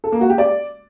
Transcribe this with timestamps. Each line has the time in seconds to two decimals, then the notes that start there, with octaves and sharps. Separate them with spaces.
0.04 A4
0.12 A#3
0.21 F#4
0.30 G4
0.38 D5